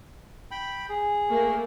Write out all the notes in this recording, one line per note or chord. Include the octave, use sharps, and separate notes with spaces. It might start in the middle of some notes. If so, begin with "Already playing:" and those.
G5 B5
G#4
A3 A#3